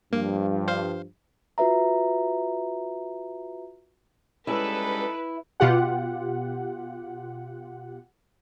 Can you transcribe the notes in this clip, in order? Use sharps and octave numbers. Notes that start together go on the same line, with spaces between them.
G2 F3 A#3
C5 F5
F4 F#4 B4 E5 A#5
G3 G#3 C#4 D#4 E4 A4 B4
B2 F4 G4 F#5